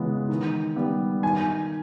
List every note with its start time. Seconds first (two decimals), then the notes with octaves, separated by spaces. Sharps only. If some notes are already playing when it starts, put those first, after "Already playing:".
Already playing: C#3 E3 G#3 B3
0.29 D#3
0.76 G3 B3
1.23 D#3 G#5